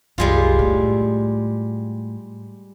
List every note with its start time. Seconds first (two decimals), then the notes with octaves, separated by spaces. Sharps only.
0.18 C2 F#2 G3 G#3 F4
0.59 A2